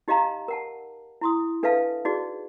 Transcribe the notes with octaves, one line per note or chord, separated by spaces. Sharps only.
D#4 G4 D#5 F5 A#5 B5
A#4 F#5 A5
E4 C6 D#6
D4 A4 B4 E5 F5 A5
D#4 F#4 G#4 D5